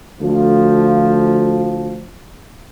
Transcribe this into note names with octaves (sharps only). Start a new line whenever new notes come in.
D2 F3